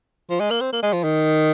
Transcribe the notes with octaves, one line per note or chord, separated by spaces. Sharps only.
F3
G#3
A#3
C4
A#3
G#3
F3
D#3